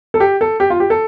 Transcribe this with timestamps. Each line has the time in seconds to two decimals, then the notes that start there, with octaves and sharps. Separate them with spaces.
0.14 A4
0.20 G4
0.41 A4
0.60 G4
0.70 F4
0.80 G4
0.90 A4